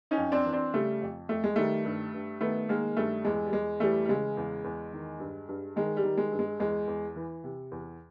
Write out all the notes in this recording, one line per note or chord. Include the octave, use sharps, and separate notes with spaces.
C#4 D#4
F2
C4 D4
E3
C4 D4
C#3 G3 A3
F2
F2 A3
G#3
D#3 G3 A3
G2
G2
D#3 A3 B3
D#3 G#3 A#3
G2 G3 A3
E2 G#3
G3
E2 G#3
E3 G3 A3
G3
C#3 G#3
E2
E2
D#3
G2
G2
D#3 G#3
G3
D#3
G#3
G2
G#3
E2 G#3
E2
E3
C3
E2